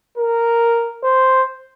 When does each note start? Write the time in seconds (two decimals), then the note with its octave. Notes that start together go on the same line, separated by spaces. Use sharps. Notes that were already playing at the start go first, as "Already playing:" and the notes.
0.18 A#4
1.04 C5